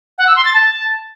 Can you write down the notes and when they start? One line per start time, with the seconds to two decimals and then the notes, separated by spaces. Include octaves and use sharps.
0.18 F#5
0.27 E6
0.36 C6
0.45 A6
0.54 A5